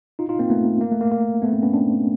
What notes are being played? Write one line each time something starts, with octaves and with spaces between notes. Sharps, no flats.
D#4 F4
D#4 F4
A#3 C4
A3 B3
A#3
A3
A#3
A#3
A3 B3
A#3 C4
B3 C#4
C4 D4